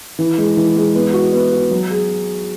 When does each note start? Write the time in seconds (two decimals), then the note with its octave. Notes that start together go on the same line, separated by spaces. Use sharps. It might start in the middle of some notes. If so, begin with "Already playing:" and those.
0.19 E3
0.38 G#3
0.57 E3
0.76 G#3
0.95 B3
1.14 F#4
1.33 B3
1.52 F#4
1.71 F#3
1.90 G#4